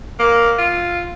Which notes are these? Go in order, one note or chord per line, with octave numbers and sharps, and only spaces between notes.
A#3
F4